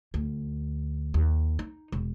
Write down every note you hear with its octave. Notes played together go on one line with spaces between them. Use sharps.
D2
D#2
D#4
E1